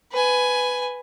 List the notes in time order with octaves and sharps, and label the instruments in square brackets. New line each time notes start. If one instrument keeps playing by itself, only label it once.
[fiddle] B4 G#5